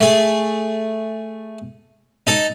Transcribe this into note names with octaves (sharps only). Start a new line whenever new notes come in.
A3 G#4
D#4 A4